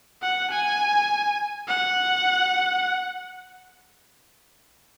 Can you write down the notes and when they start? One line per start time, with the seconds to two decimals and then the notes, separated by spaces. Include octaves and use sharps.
0.22 F#5
0.51 G#5
1.68 F#5